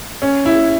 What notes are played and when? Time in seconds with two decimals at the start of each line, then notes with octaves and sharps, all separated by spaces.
0.22 C#4
0.46 E4